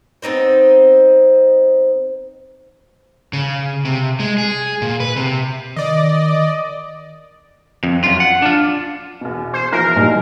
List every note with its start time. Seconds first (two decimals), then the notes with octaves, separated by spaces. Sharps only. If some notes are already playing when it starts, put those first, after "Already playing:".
0.22 B3 C4 D#4 C5
3.33 C#3
3.85 C3
4.20 G#3
4.38 G#4
4.82 A#2
5.00 B4
5.16 C3
5.76 D#3 D5 D#5
7.83 F2
8.04 F#2 F4
8.20 F#5
8.42 D4 F4
9.21 E2 B2
9.54 C5
9.72 B2 E3 F3 A#4
9.96 C2 A#2 G3 D#4 G#5